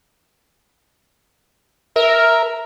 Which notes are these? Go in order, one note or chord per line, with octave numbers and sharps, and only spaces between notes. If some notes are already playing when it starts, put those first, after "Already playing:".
A#4 E5